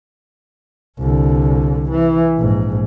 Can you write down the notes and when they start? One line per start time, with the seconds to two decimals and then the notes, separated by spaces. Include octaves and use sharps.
0.99 C2 D3
1.91 E3
2.38 A#1 G#2